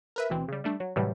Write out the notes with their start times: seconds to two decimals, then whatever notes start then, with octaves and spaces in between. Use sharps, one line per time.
0.16 A#4 B4 E5
0.30 D2 B2 E3 C4
0.48 C#3 G3
0.64 G3 A3 D4
0.80 F#3
0.96 A2 C3 E3 F#3 G3